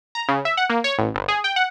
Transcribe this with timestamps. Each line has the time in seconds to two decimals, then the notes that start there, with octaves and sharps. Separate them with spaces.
0.15 A#5
0.29 C#3
0.45 E5
0.57 F#5
0.70 A#3
0.84 C#5
0.98 A1
1.15 G1
1.28 G#4
1.44 G5
1.56 F#5